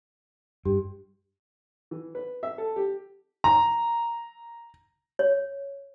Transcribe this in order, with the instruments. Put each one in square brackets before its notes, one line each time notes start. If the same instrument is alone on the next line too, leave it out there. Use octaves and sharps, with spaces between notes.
[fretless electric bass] G2 [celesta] G4
[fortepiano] E3
B4
E5
A4
G4
[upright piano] A#5
[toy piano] C#5